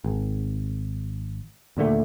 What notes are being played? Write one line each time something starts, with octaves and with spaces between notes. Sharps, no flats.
G#1
D#2 A#2 D3 A3